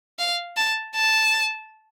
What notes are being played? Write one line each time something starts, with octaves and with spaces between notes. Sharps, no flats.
F5
A5
A5